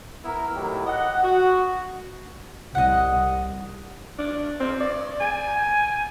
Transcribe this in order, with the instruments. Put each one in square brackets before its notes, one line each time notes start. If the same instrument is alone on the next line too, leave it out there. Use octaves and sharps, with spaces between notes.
[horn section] B3 E4 A#4
A2 D#3 F#3 E4 G4
D#5 F#5
F#4
[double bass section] C2 [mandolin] D#5 F#5
[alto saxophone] D4
C4
D5
G#5